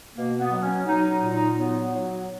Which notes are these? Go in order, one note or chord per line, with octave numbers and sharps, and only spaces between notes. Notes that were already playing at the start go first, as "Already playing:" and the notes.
B2 A#3
B3
F#3
C#4
F#3 D#4
D#4
A#2
D#4
F#3 B3
F#3